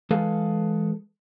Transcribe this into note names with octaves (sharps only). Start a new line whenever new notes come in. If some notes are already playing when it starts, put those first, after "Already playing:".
E3 G#3 G#4 A4 B4 F5